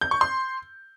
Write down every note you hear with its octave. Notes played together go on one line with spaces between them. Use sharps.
G6
C#6
C6